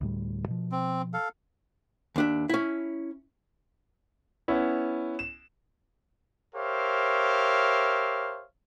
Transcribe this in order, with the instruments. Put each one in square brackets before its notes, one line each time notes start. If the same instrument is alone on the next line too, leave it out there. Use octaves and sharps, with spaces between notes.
[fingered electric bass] D2 A2 G3
B2 F3
[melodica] C4
A4 F5
[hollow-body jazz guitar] D#2 D4 E5
C#4 E4
[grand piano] B3 C#4 E4
E7
[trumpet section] G4 A#4 C5 C#5 E5 F5